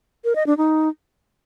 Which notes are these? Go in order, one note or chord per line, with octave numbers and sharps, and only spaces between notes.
A#4
D#5
D4
D#4